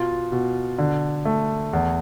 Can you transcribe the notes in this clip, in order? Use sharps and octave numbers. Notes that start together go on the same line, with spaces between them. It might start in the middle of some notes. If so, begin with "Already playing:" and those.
Already playing: B2 F4
B2
D3
A3
E2